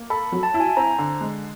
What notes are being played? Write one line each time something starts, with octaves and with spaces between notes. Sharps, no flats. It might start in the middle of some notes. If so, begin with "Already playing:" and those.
Already playing: A#3
A4 B5
F#3
A5
E4
G#5
C4 A#5
D3
G#3